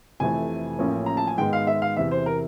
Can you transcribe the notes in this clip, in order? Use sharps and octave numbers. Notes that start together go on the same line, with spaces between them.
F1 F2 C3 E3 A3 G#5
A1 A2 F3 A#3 C#4
A#5
A5
G#5
G#2 D#3 G#3 B3 G5
F5
E5
F5
E2 C3 E3 E5
C5
A#4